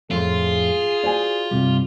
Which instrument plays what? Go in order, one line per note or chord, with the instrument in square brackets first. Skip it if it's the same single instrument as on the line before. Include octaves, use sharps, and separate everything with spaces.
[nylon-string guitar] F2 A2 [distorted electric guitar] F4 [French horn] G#4 [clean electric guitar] A4 C6
[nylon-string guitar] F#4 C5 G#5 [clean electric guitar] D5
[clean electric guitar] G2 C3 G3